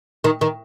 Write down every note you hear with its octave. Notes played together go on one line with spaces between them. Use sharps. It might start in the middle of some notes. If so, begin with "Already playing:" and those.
D#3
D#3